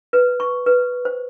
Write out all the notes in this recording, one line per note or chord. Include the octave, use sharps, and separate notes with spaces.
B4
C#6
B4
C5